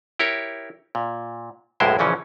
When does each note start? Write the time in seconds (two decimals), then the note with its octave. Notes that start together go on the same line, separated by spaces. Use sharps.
0.19 E4 G4 A#4 C#5
0.95 A#2
1.80 B1 F#2 A2 G#3 E4 C5
1.99 A#1 C#3 E3 F3 C#4